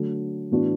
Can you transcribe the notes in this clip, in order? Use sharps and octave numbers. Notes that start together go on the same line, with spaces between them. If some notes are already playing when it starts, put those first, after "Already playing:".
Already playing: D3 F#3 A3
A2 E3 B3 D4 F#4